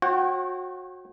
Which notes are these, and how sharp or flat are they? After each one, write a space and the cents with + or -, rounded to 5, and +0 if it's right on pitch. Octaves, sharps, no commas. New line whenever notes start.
F#4 -20 C#5 -45 G5 -35